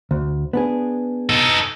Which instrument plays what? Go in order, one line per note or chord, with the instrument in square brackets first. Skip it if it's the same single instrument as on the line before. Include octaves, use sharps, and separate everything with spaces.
[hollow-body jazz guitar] D2
B3 D4 G#4
[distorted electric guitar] D#4 A4